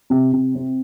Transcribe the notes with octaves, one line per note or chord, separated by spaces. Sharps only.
C3
C3
C4